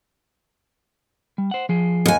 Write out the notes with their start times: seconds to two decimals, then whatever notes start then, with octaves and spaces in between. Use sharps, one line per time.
1.38 G3
1.51 C5 F#5
1.69 F3 G#4
2.06 D#2 G#5